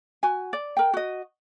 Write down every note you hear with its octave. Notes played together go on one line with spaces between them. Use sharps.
F#4 G#5
D5
A#4 G5
F#4 D#5